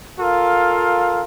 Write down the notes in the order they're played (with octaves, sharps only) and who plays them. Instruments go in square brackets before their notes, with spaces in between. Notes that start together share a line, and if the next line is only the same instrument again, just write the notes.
[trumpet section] F4 A4 A#4 F5